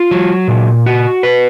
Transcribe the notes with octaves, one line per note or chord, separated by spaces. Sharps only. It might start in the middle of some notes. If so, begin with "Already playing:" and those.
Already playing: F4
F#3
A#2
F#4
B4